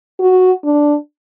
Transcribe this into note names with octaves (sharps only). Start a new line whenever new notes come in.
F#4
D4